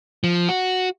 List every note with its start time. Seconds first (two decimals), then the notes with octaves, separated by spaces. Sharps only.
0.24 F3
0.49 F#4